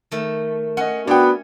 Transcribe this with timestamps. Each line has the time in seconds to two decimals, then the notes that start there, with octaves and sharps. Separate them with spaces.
0.11 D#3 A3
0.77 C#4 D#5 F#5
1.07 B3 D4 F#4 C#5 G5